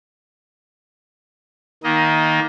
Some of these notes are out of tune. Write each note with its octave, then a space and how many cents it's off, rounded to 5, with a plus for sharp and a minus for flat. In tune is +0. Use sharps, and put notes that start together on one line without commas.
D#3 +15 A#3 +20 D#5 +10